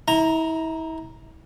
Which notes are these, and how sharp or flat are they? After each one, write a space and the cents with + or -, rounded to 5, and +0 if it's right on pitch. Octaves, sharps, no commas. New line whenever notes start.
E4 -35 A#5 +0